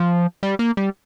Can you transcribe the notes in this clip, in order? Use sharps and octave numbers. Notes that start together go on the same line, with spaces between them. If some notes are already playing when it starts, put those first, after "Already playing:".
Already playing: F3
G3
A#3
G3